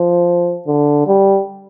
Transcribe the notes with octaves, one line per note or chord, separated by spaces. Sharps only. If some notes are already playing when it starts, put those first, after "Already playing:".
Already playing: F3
D3
G3